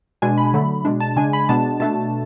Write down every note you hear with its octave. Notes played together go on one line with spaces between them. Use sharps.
B2 G#3 D4 G#5
B5
D3 F#3 A3
B2 G#3 D4
A5
C#3 G#3 D4 G#5
B5
B2 G#3 B3 D4 A5
B2 A3 D4 A5